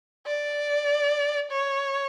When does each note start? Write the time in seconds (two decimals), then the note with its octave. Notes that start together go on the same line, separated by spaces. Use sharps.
0.27 D5
1.51 C#5